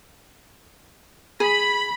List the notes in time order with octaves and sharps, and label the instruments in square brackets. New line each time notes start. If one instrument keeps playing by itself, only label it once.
[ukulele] G#4 [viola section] B5